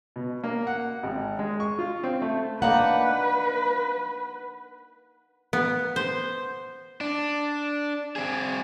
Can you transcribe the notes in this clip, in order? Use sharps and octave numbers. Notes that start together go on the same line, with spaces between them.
B2
A#3
F#5
G#1
G#3
C#6
F4
C4
A3
A#3 D4 D#4 B4 F#5
B3
C5
D4
C4 G#4